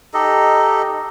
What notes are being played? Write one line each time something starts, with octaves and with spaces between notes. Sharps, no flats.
D#4 G4 A4 D#5